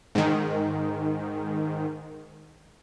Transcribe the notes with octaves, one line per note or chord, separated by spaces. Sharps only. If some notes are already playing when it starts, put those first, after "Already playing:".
G#2 D#3